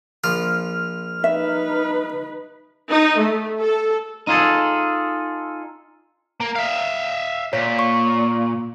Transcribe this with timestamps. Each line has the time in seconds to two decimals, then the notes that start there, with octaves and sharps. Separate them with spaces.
0.24 A#1 F3 A#4 F6
1.24 D#4 B4 E5
2.90 D#4
3.19 A3
3.60 A4
4.27 D#4 F4 G#4 A4
6.40 A#3
6.55 E5 F5
7.53 A#2 C#5 B6
7.79 C#6